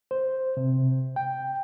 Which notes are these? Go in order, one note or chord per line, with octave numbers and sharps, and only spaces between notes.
C5
C3
G5